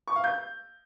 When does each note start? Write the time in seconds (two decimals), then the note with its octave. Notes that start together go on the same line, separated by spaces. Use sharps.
0.08 C#6
0.16 F5
0.24 G6